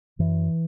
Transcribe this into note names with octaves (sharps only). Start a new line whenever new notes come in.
F#2 E3